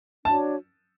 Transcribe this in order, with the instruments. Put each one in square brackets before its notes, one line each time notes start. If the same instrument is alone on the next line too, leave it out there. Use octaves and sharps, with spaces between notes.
[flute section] D4 F#4 C#5 [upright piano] A5